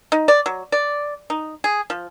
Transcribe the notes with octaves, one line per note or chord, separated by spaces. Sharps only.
D#4
D5
F#3
D5
D#4
G#4
F3